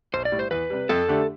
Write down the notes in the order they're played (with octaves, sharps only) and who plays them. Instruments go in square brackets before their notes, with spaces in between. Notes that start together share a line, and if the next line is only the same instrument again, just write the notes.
[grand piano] B1 [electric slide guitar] C5
[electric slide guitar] D5
[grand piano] A2 G3
[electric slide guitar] C5
[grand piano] E2 [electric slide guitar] B4
[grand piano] C3 G3
[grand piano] F2 [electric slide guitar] A4
[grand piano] D3 A3 D4 G4